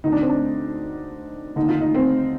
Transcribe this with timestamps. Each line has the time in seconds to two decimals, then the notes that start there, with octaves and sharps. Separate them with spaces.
0.04 D2 D3 D#4
0.12 D4
0.21 C4
0.29 D4
1.56 D#2 D3 D#4
1.68 F4
1.81 D#4
1.95 C4